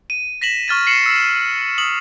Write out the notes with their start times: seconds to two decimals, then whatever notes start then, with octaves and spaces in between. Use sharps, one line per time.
0.10 D#7
0.41 A#6 B6 E7 F#7
0.68 C#6 F6 A6 D#7
0.87 C7 C#7 E7 F#7
1.06 E6 C7 E7
1.78 D#6 F#7